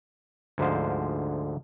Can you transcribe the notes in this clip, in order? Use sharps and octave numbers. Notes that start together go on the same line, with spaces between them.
D2 G#2 D3 F3 C5